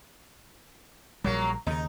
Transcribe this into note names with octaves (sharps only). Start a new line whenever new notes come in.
A#1 F#3 G3 A#3
D#2 C#3 D#4